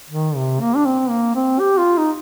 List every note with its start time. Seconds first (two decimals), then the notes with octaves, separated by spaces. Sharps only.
0.10 D#3
0.36 C3
0.61 A#3
0.76 D4
0.85 C4
1.10 A#3
1.35 C4
1.59 G4
1.77 F4
1.97 D#4